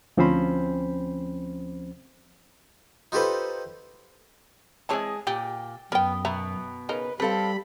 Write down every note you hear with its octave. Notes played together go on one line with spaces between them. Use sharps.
D2 F3 C4 C#4 C5 B5
D#4 F4 G4 A4 B4 C5
E3 G#3 C4 G#4 C#5 A5
A#2 G4
F#2 B3 A#4 G5
B2 B3 E5 A#5
C#3 D#4 A#4 B4
G3 C4 A4 B4 F5 B5